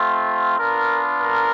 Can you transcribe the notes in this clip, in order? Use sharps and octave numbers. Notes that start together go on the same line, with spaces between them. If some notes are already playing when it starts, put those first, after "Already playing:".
Already playing: A3 C4 F4
B3 D4 F4 A#4
A#4